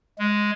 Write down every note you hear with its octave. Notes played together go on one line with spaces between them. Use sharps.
G#3